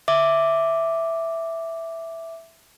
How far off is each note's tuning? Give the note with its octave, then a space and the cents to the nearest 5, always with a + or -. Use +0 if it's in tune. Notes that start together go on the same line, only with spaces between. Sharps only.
E5 +0 D6 +0